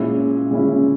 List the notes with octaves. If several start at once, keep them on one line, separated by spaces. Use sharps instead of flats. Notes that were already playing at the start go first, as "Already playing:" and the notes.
Already playing: A#2 G#3 C#4 E4
A#2 G#3 C#4 E4